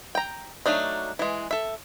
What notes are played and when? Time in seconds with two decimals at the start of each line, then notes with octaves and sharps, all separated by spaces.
0.15 G5 A#5
0.66 F#3 A3 D4 D#4
1.19 E3 G#3
1.51 A4 E5